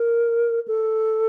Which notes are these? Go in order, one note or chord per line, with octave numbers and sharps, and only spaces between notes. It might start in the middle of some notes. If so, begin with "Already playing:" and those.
Already playing: A#4
A4